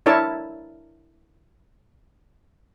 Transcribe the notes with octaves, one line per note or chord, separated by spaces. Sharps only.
D4 E4 A#4 C#5 E5 A5